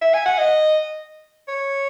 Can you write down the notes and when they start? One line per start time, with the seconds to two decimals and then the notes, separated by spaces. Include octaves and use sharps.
0.01 E5
0.14 G#5
0.26 F#5
0.38 D#5
1.48 C#5